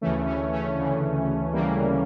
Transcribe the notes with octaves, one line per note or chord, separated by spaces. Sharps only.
D2 C#3 E3 A3 C#4
A3 C#4
A3 C#4
D2 C#3 E3
D2 C#3 E3 G3 A#3